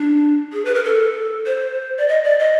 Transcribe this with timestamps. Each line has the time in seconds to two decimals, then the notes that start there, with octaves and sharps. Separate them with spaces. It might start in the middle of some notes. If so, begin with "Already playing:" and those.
Already playing: D4
0.53 G#4
0.65 B4
0.74 A#4
0.84 A4
1.46 C5
1.98 D5
2.08 D#5
2.24 D5
2.39 D#5